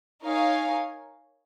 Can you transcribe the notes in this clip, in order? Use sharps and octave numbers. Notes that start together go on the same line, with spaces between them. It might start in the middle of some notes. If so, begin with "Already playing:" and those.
D#4 A#4 C#5 F5 G#5